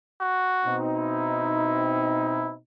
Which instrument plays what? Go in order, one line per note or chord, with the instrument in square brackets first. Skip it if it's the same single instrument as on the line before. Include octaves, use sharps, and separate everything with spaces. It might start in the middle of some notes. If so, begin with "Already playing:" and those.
[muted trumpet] F#4
[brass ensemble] B2 C4 D#4
[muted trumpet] E4